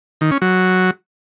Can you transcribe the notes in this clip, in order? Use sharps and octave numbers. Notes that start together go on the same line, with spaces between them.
D#3
C#4
F#3